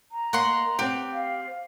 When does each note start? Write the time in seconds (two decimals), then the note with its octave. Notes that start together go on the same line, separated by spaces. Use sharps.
0.12 A#5
0.33 A#3 D#5 F#5 C6
0.79 C4 G4 F#5
1.13 F5